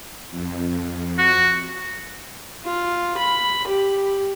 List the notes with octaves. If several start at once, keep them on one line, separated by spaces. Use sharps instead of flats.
F2
F#4
F4
B5
G4